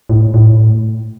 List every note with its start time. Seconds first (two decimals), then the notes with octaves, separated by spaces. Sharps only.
0.09 A2
0.34 A2